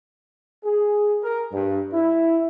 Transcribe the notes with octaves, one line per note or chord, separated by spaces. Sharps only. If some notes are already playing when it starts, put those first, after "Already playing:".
G#4
A#4
G2
E4